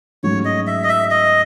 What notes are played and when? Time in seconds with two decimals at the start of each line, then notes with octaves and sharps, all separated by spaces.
0.23 G#2 F#3 A3 C#4 C#5
0.45 D#5
0.67 E5
0.84 D#5
0.89 E5
1.11 D#5